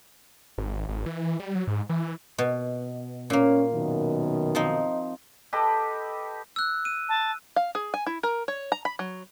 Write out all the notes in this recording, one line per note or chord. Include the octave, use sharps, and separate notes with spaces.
G#1
G#1
E3
G3
F#3
G#2
E3
B2
A#2 A#3 C#4
F#2 B2 D#3
F3 C4 D#4
G4 A4 B4 D#5
E6 F#6
D#7
A5
F5
G#4
G#5
E4
A#4
C#5
A#5
B5
F#3